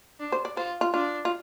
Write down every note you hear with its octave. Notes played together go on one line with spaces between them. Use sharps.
D4
C5
D5
F4 C5
F4
D4 F4
F4